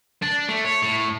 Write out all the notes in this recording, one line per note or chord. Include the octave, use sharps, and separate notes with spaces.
D4
A3
C#5
A2